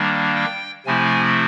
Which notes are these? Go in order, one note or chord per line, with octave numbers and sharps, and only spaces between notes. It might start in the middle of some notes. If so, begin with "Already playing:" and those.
Already playing: D#3 G3 A#3 D4
G5
C3 F3 A3 C4 E4 G#5